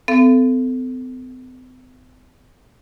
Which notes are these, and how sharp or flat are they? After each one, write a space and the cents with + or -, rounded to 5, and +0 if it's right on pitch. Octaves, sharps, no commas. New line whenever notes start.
C4 -45 A4 +0 F5 -35